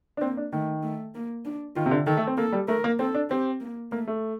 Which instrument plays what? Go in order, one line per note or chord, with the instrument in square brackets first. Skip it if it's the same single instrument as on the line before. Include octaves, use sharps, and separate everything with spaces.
[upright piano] D4
[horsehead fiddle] A#3 [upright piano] C4
[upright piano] D4
[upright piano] D#3 [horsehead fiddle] A3
[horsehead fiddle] A3
A#3
D4
[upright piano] D#3 [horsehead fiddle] F4
[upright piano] C3
D3
[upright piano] D#3 [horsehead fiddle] A4
[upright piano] A3
C4
[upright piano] A#3 [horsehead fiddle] A4
[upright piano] G3
[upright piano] A3 [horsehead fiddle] A#4
[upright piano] A#3
[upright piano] C4 [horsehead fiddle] A4
[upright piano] D4
[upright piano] C4 [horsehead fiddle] G4
[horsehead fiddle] A#3
[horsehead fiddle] A3 [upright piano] A#3
[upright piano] A3